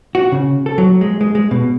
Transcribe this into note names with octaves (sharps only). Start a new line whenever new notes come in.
F#4
C#3
A4
F#3
G#3
G#3
G#3
B2